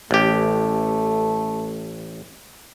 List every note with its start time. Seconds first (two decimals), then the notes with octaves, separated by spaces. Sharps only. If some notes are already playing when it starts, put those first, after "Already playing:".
0.11 A1 A3 G4